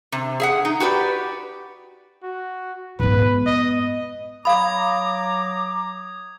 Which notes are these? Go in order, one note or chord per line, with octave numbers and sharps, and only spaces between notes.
C3
G#4 E5 F#5
D#4
F#4 G4 B4 D5
F#4
G#2 B3 B4
D#5
F#3 F5 A#5 B5 D6 D#6 G#6